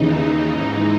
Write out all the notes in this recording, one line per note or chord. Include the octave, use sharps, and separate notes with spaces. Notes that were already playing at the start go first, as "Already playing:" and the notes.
Already playing: D#2 C#3 E3 D#4
G#2 E3